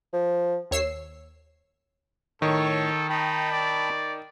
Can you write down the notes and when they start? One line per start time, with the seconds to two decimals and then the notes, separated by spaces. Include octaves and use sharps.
0.13 F3
0.71 D#2 C#5 E6 C7
2.42 A2 D#3 A4 C#5 C#6
3.10 D#4 G5 A5 B5
3.52 D5